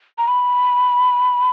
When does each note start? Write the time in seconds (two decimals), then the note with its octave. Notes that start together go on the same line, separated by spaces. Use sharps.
0.18 A#5
0.28 B5